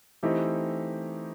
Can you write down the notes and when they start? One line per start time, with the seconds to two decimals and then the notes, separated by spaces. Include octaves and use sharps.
0.23 E3 A3 C4 D#4 G4